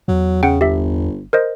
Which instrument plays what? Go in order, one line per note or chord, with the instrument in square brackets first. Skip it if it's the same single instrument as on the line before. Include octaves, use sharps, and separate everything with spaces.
[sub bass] E2 [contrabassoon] F#3
[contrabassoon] C#3 [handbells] F#5 G5
[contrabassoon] G1 [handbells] G4 E5
[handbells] A#4 C5 D#5